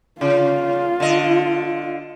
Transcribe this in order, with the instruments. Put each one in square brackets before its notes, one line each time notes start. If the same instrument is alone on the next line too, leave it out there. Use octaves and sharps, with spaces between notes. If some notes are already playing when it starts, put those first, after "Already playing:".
[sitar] C#3 [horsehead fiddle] F4
[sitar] D3 D#5